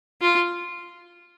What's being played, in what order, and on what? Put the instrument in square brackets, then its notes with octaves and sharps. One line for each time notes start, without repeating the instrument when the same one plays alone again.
[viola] F4